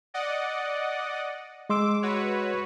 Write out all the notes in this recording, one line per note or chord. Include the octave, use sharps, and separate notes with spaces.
D5 D#5 F#5
G#3 C6 D6 E6
F#4 B4 C#5